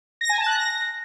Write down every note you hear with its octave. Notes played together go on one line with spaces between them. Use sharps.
A#6
G#5
A5
F#6
A#6